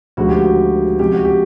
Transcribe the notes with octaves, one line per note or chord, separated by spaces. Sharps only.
D2 C#3 F3 G#3 F#4
G4
F#4
C#2 C3 F3 G#3 G4
F#4
G4